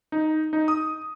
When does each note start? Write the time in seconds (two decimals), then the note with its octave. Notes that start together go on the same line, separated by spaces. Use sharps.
0.12 D#4
0.53 D#4
0.68 D#6